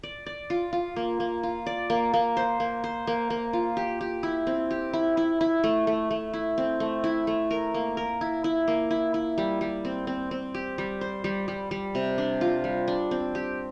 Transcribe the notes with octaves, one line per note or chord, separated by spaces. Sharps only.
D5
D5
F4
F4
A#3
A#3
F4
D5
A#3
A#3
C5
A#3
C5
A#3
A#3
F4
G4
G4
E4
C4
G4
E4
E4
E4
A3
A3
A3
E4
C4
A3
E4
A3
A#4
A#3
A#4
E4
E4
A#3
E4
E4
G3
G3
C4
C4
C4
G4
G3
C5
G3
G3
G3
C3
D4
F4
G3
D4
C4
G4